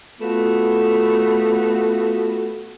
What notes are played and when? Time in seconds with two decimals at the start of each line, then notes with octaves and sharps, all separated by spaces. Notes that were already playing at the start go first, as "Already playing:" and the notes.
0.21 A3 B3 F4 F#4